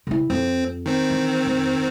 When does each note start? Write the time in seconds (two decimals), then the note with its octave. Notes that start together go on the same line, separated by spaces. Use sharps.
0.07 C#3 E4
0.30 F2 C4
0.86 D#3 C4
1.10 E3
1.46 F2